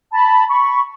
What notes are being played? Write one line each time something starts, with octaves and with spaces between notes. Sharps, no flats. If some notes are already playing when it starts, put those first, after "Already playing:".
A5 B5
B5 C#6